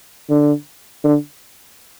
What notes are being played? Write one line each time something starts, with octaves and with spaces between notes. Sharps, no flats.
D3
D3